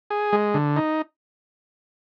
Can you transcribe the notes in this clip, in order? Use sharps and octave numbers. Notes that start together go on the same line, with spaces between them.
G#4
G#3
D3
D#4